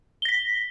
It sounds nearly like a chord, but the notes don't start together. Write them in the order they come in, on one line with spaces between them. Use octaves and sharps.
G7 A#6 B6